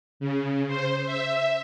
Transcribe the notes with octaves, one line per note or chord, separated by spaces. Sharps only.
C#3
C5
E5